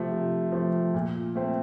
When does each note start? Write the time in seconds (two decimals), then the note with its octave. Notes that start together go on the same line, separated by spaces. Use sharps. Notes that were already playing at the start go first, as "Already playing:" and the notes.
Already playing: C3 F3 A3
0.12 C3
0.52 F3 A3
0.94 A#2
1.36 A3 C4